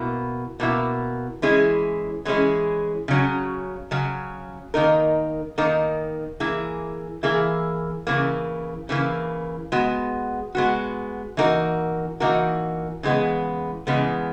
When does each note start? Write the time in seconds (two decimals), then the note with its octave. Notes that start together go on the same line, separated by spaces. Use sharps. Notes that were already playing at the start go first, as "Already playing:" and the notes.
Already playing: B2 A#3 E4
0.60 B2 A#3 E4
1.42 E3 G#3 C#4 E4 G#4
2.25 E3 G#3 C#4 E4 G#4
3.08 C#3 F#3 C#4
3.91 C#3 F#3 C#4
4.74 D#3 A#3 D#4 A#4
5.58 D#3 A#3 D#4 A#4
6.40 E3 A#3 E4 G#4
7.23 E3 A#3 E4 G#4
8.07 C#3 E3 A#3
8.89 C#3 E3 A#3
9.72 G#3 B3 F#4
10.55 G#3 B3 F#4
11.37 E3 A#3 D#4 F#4 A#4
12.20 E3 A#3 D#4 F#4 A#4
13.03 C#3 E3 G#3 B3
13.87 C#3 E3 G#3 B3